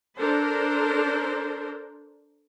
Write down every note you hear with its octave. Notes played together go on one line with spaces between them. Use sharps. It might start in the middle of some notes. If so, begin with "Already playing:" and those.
D4 A4 A#4 C5